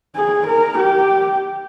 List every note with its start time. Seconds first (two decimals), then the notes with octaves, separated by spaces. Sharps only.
0.16 G#4
0.48 A#4
0.79 G4